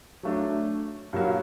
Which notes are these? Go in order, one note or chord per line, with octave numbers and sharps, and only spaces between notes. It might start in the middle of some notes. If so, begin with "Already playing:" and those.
F#3 A3 D4
G2 F#3 A#3 F#4